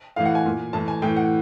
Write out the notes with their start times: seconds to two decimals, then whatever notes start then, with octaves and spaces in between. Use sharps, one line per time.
0.16 A2 E3 F5
0.25 F#5
0.35 G#5
0.46 A#2
0.73 A2 E3 A5
0.88 G#5
1.02 A2 E3 G5
1.17 F#5